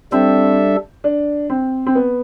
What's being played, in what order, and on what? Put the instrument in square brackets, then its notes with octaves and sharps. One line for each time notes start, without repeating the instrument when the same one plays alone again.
[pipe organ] G3 D4 A4 E5 [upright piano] C4
[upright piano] D4
C4
C4
B3